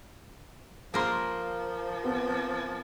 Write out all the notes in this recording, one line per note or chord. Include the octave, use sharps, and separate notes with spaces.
F3 A#3 A#4 C6
B3 C4